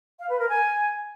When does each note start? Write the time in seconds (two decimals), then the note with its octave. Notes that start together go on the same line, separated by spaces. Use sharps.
0.19 F5
0.29 B4
0.39 A#4
0.49 G#5